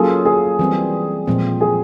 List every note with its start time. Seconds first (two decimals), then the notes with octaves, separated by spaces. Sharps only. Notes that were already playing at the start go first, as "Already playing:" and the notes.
Already playing: F#3 A#3 C#4 F4 G#4 A4
0.25 G#4
0.59 E3 G3 C4
1.27 A#2 F3 G#3 C4
1.61 G#4